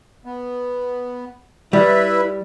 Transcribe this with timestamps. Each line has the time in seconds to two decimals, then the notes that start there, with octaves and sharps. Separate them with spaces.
0.26 B3
1.73 G3 E4 B4 E5